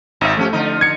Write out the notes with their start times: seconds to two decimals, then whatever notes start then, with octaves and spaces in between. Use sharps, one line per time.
0.21 G#1 D#4 E5
0.37 F3 A3 C#4 G4
0.53 D3 F3 D#4
0.81 G#6 C#7